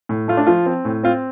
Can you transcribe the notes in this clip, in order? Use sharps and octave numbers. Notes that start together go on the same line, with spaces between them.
A2
A3 F4
D4
F3 F4
C4
A2
C4 F4